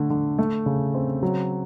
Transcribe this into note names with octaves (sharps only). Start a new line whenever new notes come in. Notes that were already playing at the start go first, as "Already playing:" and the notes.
Already playing: D3 A3
D3
A3
C#3
C4
F#3